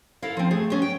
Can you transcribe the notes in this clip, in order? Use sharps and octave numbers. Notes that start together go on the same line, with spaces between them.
E4 A4 A#4 F5
F3 C4
A3 G#4
B3 C#4
G5